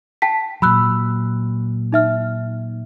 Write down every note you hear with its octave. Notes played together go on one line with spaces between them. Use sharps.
G5 A5 B6
A#2 F#3 B5 E6 F#6
D#4 E5 F6